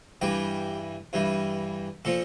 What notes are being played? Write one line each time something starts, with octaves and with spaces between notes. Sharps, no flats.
G2 E3 G3 G4
G2 E3 G3
A#2 F3 A4